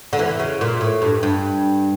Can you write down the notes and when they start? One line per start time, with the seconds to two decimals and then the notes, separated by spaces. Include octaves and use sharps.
0.13 D3
0.19 E2 E3
0.39 C#3
0.61 A#2
0.81 A2
1.02 G2
1.23 G2